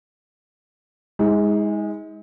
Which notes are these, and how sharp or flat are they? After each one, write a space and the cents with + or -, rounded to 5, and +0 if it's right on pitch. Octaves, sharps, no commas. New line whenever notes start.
G#3 -15 D#4 +40